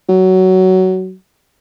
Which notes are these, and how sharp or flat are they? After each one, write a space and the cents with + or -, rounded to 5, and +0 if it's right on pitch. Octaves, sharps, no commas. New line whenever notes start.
F#3 +15